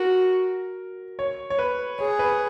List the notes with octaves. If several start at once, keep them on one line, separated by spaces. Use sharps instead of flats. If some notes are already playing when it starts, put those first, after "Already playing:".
Already playing: F#4 A#4
C#5
C#5
B4
G#4 C#5
B4